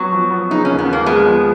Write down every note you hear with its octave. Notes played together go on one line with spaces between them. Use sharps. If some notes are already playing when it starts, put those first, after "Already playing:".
Already playing: F#3 B3
F3
B3
C#3 D#4
D#2 C#4
B3
D#2
A#3
G#3 B3
F3